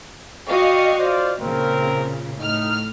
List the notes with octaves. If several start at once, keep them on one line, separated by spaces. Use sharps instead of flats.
F#4 D5 D#5 F5 G5 C#6
F4 C5 D5
A#2 C#3 C4 A#4
A2 D#4 F6